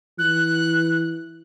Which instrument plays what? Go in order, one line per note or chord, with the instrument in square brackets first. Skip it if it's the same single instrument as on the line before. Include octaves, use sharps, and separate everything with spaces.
[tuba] E3 [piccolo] F#6